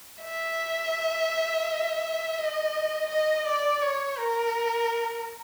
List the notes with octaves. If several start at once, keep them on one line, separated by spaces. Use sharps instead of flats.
E5
D#5
D#5
D5
C#5
A#4